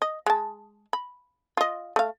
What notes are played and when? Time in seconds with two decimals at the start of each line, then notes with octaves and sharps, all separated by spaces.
0.02 D#5
0.26 G#3 A5
0.93 B5
1.57 F4 D#5
1.96 A3 F5